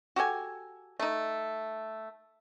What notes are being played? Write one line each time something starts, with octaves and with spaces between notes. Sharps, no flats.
F#4 G4 A4 G#5
A3 D#4